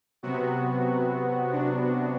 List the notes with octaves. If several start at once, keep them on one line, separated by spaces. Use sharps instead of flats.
C3 F#3 B3 F#4
D4